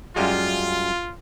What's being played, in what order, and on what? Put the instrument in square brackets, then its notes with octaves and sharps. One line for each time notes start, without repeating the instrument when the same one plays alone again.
[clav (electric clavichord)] F#2 G3 G#3 [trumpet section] F4